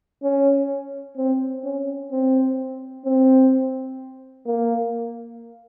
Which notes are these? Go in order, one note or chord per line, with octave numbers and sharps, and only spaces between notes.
C#4
C4
C#4
C4
C4
A#3